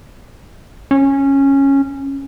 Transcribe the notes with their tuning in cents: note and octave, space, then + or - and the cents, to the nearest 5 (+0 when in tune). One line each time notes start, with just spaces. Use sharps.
C#4 -10